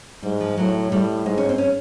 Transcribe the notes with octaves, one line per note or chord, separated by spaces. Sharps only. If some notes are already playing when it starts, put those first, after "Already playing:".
G#2 G3
F3
A2 F#3
A2 G3
G#2 G#3
C#4
C4
C#4